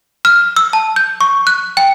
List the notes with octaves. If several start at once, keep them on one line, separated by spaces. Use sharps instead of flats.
F6
E6
A5
G6
C#6
F#6
G5